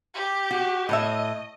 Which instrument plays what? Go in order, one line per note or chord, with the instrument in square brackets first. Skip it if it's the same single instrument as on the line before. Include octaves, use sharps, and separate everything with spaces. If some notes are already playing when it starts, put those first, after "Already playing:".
[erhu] G4
[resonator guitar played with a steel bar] F#4
[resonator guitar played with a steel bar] A2 C#5 E5 [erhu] D#5